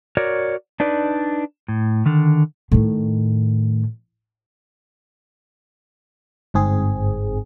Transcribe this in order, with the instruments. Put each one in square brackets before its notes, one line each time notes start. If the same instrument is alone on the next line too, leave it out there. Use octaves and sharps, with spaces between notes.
[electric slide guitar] F#4 A#4 C#5 D5
D4 D#4 B4 D5
A2
D3 D#3
[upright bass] A2 D#3
[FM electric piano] G1 G#2 C4 G#4